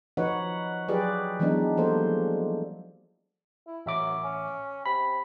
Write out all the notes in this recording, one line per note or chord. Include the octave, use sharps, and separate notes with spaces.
F3 D#4 F#4 B4 C#5 F#5
F#3 F4 G4 G#4 B4 D5
E3 F#3 G#3 B3 D4 D#4
F3 G3 A#3 A4 C5
E4
A1 F#2 E5 D6
C#4
C3 B5